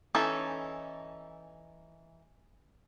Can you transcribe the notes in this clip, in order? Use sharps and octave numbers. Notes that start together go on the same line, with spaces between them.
E3 C#4 D#4 A4